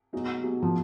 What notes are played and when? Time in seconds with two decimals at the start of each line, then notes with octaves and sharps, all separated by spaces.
0.13 B2 F#3 A#3 D#4 G#4
0.43 B2 F#3 A#3 D#4 G#4
0.62 F3